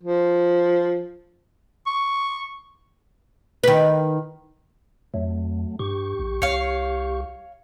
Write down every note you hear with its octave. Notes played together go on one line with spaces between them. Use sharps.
F3
C#6
D#3 B4
F2 F#3 A3
G2 G4 C#6
A#1
C2 C#5 F5